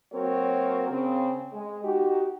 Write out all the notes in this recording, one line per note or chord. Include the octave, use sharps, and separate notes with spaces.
F#3 A#3 C4 F#4 A#4 C#5
C#3 C4
G#3
D#4 F#4 G4